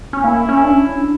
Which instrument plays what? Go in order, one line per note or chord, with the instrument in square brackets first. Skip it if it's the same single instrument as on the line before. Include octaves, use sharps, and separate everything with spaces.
[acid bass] C#4
[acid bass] A#3 [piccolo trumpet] E4
[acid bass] C#4
D4
C#4
D4